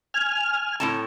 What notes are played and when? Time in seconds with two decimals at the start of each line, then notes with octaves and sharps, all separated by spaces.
0.14 G#5 F6
0.80 A2 C4 A5